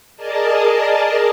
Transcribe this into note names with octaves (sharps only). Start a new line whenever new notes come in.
G#4 A#4 D5 D#5 A5